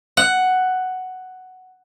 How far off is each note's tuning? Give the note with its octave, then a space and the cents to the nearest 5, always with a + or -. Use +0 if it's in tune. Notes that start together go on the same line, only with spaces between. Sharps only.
F#5 +5